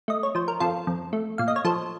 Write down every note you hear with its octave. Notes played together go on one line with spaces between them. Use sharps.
A3 D#5
C#5
F3 C5
A#4
F2 F4 A4
F2
A3
A#2 F5
D#5
C#5
F3 A4 C5